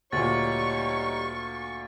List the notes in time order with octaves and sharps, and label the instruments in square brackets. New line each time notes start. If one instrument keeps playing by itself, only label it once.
[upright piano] D2 A#2 [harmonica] G3 D#4 C#5 [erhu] C#6 [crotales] A6